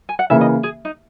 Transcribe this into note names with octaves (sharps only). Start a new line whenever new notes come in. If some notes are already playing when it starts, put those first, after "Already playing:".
G#5
F#5
C#3 E3 A#3 E5
D#5
G#4
D#4